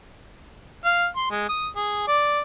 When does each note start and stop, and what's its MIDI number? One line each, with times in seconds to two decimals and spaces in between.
0.85 1.07 77
1.16 1.27 84
1.31 1.46 56
1.49 1.68 87
1.76 2.08 68
2.08 2.42 74